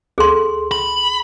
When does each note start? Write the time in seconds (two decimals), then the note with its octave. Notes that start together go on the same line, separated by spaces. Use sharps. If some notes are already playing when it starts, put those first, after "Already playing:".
0.18 D2 G#4 A4 C6
0.72 B5